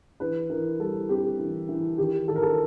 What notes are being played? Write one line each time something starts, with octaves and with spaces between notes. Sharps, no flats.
E3 B4
E3 A#4
G3 A4
C4 G4
E3
E3
D#3 G4
D#3 A4
A#4
A4